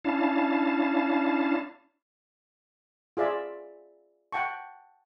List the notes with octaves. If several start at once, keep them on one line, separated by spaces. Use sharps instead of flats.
C#4 D4 E4 F5 A5
F4 G#4 D5 E5
F#5 G5 A5 C#6